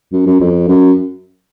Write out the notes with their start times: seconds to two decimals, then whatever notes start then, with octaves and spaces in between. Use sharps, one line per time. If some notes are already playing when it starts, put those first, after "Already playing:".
0.12 F#2
0.26 F#2
0.40 F2
0.68 F#2